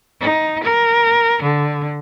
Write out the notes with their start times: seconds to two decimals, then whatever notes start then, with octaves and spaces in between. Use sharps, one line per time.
0.20 D#4
0.63 A#4
1.42 D3